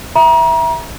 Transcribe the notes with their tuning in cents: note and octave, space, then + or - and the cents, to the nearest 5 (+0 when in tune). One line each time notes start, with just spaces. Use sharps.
E5 +0 A#5 +35